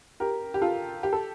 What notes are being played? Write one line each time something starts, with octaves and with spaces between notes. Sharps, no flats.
G4 A#4
G4
F4 A4
G4
A4